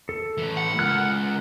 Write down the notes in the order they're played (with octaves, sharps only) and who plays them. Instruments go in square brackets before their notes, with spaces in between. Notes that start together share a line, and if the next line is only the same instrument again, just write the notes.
[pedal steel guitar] A4
[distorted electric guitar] A2 E3
[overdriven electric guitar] F#5
[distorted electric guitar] C#2 [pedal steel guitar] A#4 F6 F#6